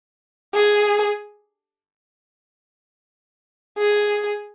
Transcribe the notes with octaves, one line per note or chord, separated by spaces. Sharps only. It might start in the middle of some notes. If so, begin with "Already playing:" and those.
G#4
G#4